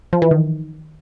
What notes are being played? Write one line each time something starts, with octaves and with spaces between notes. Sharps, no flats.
F3
E3
D#3